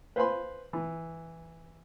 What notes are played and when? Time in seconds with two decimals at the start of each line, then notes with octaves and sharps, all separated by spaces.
0.16 B4 C5 F5 G#5 B5 C6
0.73 E3